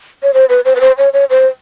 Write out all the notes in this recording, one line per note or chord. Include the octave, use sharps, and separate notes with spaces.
C#5
C5
B4
C5
B4
C5
C#5
C#5
C5